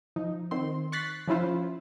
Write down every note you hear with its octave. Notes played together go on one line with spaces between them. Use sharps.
F3 D#4
D#3 C4 C6
C#6 F#6 A6 B6 C7
F3 C#4 E4 F4 C5